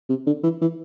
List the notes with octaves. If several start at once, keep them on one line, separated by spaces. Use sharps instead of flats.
C3
D3
E3
E3